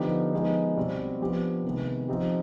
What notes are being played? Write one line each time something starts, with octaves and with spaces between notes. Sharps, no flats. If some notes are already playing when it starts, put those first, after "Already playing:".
Already playing: D3 F3 B3 D#4 G4
F3 G#3 B3 D#4
B2 G3 C4
F3 B3 D4 G4
C3 D#3 G#3 B3
F3 C4 D#4 G4